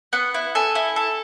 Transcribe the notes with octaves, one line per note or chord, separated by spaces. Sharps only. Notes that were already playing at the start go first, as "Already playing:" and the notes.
B3 F#5
E4
A4 G#5
E4
A4